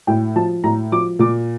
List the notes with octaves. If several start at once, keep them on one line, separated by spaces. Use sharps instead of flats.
A2 G5
F3 A5
A2 A#5
F3 D6
A#2 D6